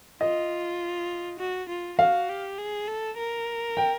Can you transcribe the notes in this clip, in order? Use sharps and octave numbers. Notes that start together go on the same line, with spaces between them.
F4 D#5
F#4
F4
F#4 F5
G4
G#4
A4
A#4
G5